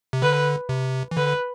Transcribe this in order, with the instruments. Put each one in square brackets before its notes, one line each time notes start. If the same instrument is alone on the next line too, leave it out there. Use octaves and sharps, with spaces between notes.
[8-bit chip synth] C3
[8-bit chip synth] D3 [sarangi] B4
[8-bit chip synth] C3
E3
[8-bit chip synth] D3 [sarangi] B4